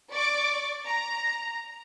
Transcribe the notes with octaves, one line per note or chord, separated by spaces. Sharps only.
D5 C#6 D6
A#5